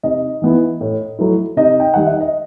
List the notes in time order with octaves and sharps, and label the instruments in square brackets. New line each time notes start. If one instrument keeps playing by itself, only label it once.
[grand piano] C3 D#4 D#5
E3 B3 E4
A2
F#3 A3 E4
C3 D#4 D#5
G5
D#3 G3 D#4 F#5
E5
D#5